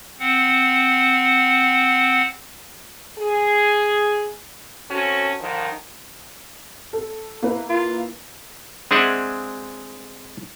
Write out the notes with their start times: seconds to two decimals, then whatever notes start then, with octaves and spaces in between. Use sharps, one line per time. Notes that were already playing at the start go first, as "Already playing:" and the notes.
0.19 C4 F#5
3.18 G#4
4.91 C4 C#4 F#4 A4
5.40 D3 D#3 F3
6.93 A4
7.42 A#3 E4 B4
7.69 F4
8.91 G#3 C4 D4 G#4 E5 F#5